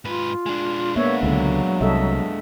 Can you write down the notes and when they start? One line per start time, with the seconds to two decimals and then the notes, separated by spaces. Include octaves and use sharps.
0.05 G#2 F4 B4
0.46 G#3 D4
0.96 A#3 B3 C#5 E5
1.23 C#2 D3 F#3
1.81 C2 A4 D#5 E5